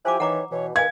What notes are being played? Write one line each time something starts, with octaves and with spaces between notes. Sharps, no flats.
F3 E4 G4 C5 G#5 D6
D#3 E3 C#5 F#5 A#5 D6
B2 E3 C#5
D#3 B4 F5 G#5 G#6